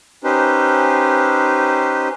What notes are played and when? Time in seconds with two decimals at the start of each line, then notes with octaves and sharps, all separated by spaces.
0.24 C#4 D#4 G4 B4 C5